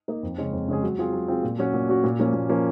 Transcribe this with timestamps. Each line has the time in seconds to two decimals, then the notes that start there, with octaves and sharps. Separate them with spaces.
0.08 A#3 D#4 A#4 D#5
0.23 F2
0.38 C#3 G#3 C#4 G#4
0.53 F2
0.68 C#3 G#3 C#4 G#4
0.83 F#3
0.98 C4 F4 G#4
1.13 F#3
1.28 C4 F4 G#4
1.43 A#2
1.59 F#3 C#4 F#4
1.74 A#2
1.89 F#3 C#4 F#4
2.04 A#2
2.19 F3 A#3 C#4
2.34 A#2
2.49 F3 A#3 C#4